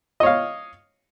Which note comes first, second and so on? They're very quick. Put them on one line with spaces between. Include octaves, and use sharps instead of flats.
D#5 C#5 F5